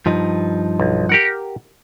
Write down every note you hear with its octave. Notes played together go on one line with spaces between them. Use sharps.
G2 F3 D#4
B1
G4 A#4 F#5